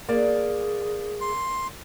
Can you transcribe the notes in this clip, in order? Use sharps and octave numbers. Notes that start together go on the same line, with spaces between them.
A#3 G#4 D5
C6